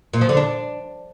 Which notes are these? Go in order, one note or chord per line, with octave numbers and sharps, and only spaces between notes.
A#2
F3
D3
D4